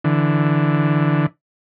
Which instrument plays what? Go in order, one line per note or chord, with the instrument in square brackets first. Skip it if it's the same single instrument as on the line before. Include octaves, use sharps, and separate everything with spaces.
[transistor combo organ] D3 E3